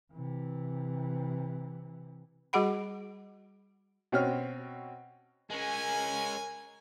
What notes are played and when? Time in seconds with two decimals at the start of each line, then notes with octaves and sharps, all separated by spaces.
0.13 C3 E3
2.53 G3 F#4 G#4 F#5 B5
4.12 B2 C4 C#4 F6
5.50 G#3 C#4 A#4 G#5